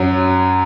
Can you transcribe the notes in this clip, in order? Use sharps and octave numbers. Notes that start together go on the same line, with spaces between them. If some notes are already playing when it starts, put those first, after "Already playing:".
Already playing: F#2 F#3